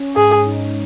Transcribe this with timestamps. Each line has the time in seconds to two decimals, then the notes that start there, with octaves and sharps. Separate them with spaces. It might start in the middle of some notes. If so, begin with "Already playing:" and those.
Already playing: C#4
0.16 G#2 G#4
0.46 D#4